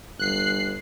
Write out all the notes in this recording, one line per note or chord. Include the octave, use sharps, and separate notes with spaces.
G1 F#6 C7